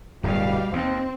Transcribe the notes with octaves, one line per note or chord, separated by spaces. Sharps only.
D1 G2 B2 G3 F5
D#2 C4